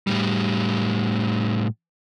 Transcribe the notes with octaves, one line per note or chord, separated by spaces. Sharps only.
A2 G3